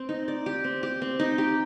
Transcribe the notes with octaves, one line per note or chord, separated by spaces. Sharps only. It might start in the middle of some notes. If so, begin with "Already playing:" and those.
Already playing: C4
D#4
D5
G4
C4
G4
C4
D#4
G4